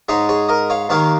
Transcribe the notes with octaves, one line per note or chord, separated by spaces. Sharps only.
G#2 G#3 D#4 G#4 C#5
G#4 C#5
A#4 D#5
C#5 F5
D#2 D#3 A#3 C#5 F5